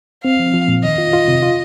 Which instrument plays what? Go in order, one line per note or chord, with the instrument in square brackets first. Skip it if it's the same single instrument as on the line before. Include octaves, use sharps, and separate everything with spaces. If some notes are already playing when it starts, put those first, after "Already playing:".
[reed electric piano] C4 [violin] F5
[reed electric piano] F3
F3
A#2
[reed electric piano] D#3 [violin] D#5
[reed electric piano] F4
F4
C3
F4